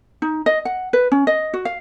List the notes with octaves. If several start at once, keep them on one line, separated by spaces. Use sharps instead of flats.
D#4
D#5
F#5
B4
C#4
D#5
F#4
F5